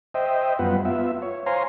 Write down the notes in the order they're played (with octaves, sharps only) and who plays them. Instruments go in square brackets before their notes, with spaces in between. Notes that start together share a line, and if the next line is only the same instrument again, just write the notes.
[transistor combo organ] C5 D#5 E5 G5
F#2 G3 B3 F4 B4 F#5
B3 F4 E5
C#5
C5 C#5 F5 G#5 A#5 C6